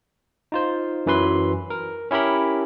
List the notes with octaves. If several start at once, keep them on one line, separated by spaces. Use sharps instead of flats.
D#4 F4 C5
F#2 E3 F#3 B4 C6
A#4
C#4 E4 G4 A#4 B5